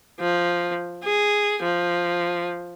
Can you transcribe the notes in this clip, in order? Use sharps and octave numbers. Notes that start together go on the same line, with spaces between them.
F3
G#4
F3